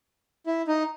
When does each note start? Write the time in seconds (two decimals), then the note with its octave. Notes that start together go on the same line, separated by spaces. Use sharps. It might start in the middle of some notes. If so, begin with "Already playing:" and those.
0.46 E4
0.68 D#4